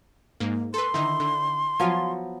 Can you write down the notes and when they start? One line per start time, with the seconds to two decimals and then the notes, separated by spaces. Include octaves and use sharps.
0.40 G#2 A#3
0.74 A4 B4 C6
0.94 D3 D#3 D#4 E4
1.20 D3
1.80 F3 F#3 B3 F4 G#5